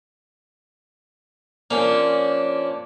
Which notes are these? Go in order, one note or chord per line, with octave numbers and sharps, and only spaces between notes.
F3 A#3 C#4 D4